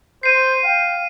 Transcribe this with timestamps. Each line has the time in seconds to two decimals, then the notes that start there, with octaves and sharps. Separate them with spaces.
0.23 C5 G6 C7 D#7
0.64 F5 G5